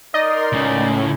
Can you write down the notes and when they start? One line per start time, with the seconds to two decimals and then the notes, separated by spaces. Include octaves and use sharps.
0.14 D#4 A#4 D5 D#5 C6
0.53 C#2 A2 C#3